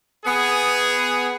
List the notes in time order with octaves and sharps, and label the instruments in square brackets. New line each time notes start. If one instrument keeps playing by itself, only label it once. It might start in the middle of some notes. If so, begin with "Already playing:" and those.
[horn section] B3 G#4